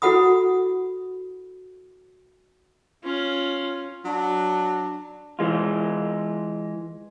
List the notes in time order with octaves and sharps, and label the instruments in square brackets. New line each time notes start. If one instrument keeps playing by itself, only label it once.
[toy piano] E4 F#4 A4 F#5 B5 D#6
[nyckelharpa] C#4 F4
[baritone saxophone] F#3 [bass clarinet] D4
[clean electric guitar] E3 G#3 F4